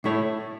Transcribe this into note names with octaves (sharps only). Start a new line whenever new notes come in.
A2 A3 E4 C#5